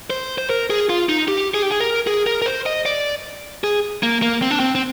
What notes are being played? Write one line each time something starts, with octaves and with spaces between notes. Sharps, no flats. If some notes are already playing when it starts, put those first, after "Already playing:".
C5
C5
A#4
G#4
F4
D#4
G4
G#4
G4
G#4
A#4
G#4
A#4
A#4
C5
D#5
D5
G#4
A#3
A#3
C4
D4
C4
C4